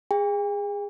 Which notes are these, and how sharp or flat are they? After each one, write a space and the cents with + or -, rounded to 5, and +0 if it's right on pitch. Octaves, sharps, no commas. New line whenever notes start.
G#4 -20 G5 +45